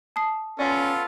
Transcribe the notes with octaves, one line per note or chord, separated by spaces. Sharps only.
A5 D#6 C7
B3 C#4 F4 A4 D5